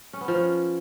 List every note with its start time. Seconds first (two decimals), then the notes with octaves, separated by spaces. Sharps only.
0.13 C#4
0.21 B3
0.28 F3
0.35 C#4